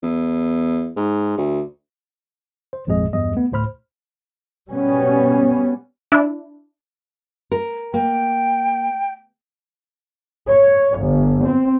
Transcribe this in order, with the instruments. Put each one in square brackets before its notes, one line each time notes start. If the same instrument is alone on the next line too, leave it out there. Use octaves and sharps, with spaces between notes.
[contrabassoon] E2
G#2
D2
[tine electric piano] C5
G#1 F2 A#2 G#3 G#4 D#5
E2 G2 G3 D#5
A3 B3
D2 A2 C5 B5 F6
[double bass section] B2 G3 B3 C#4
[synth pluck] D4 E4
[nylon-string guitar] A#4
[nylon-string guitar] A#3 [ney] G5
[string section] C#5
G1
C4